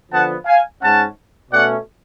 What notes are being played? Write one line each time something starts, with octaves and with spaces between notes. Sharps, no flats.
D3 F3 B3 F#5 A5
F5 G#5
G#2 G#3 C#4 F#5 A5
B2 A3 C#4 D5 F#5